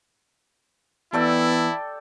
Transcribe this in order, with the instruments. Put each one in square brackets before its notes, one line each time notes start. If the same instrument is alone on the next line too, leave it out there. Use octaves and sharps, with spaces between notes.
[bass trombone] E3 [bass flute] B3 [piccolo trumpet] E4 [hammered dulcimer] A4 D5 G5